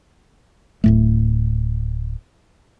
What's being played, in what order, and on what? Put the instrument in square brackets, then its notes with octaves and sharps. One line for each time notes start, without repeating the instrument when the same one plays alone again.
[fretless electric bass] D1 A2 A3